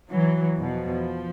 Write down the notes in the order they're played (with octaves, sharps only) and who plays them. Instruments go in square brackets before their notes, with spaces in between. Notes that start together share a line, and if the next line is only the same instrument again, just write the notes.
[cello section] E3 F#3
E2 B2 F3